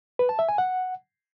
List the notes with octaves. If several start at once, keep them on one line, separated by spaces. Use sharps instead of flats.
B4
A5
E5
G#5
F#5